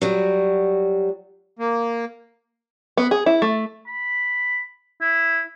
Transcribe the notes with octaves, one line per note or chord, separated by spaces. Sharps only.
F#3 G3 F#4
A#3
B3
G#4
E4
A3
B5
E4